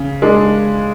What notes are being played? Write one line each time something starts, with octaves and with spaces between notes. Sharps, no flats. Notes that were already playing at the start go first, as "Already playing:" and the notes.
Already playing: C#3
G#3 D4